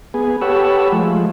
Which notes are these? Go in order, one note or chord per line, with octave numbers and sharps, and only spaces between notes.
B3 G#4
G4 A4 B4 C#5 F#5 E6
F3 G#3 A3